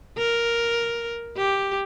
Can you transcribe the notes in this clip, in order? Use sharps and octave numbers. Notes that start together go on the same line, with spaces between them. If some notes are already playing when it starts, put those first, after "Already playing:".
A#4
G4